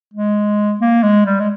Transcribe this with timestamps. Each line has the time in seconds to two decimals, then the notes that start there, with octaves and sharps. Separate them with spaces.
0.14 G#3
0.80 A#3
1.03 G#3
1.25 G3
1.40 G#3